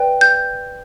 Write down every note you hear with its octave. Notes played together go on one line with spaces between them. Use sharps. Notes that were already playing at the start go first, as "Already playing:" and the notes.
Already playing: B4 D5 G5
G6